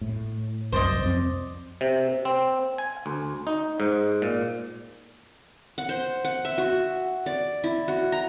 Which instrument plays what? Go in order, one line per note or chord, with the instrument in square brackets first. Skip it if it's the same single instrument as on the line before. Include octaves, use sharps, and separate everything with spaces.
[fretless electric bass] A2
[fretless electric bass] C2 F#2 [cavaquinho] C5 D5 D#5
[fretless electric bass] F2 C4
[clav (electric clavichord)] C3
C4
G#5
D2
D#4
G#2
A#2
[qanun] F#5
C5
F#5
E5
F#4
D5
E4
F#4
A#5